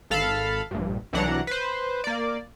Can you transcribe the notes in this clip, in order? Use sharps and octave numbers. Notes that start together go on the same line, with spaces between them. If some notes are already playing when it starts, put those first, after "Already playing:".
G#1 A4 F5 A5 B5
A#1 G2
C2 E3 F#3 D4 F#5 A#5
B4 C5
A#3 D5